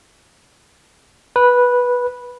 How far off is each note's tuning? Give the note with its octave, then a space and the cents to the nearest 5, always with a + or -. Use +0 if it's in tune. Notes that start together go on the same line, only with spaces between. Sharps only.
B4 -10